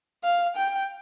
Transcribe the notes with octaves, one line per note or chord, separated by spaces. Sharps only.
F5
G5